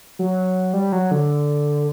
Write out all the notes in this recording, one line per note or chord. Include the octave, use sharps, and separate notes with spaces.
F#3
G3
F#3
D3